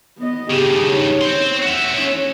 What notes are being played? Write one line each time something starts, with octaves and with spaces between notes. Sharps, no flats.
B3 D#5
G2 C#3 G4 G#4
D#4 C#5
C4 C5
F#4 E5 F#5
C#4 C#5